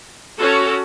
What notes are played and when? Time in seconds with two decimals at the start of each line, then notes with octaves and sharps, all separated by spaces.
0.38 C#4 F#4 A4 C#5